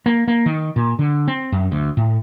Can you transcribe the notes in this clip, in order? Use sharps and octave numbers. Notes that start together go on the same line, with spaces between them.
A#3
A#3
D#3
A#2
D3
C4
F#2
D2
A2